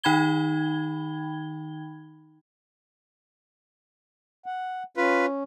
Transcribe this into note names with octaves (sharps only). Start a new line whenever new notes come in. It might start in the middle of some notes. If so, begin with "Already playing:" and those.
D#3 D#4 G5 B5 G#6 G7
F#5
C#4 F4 B4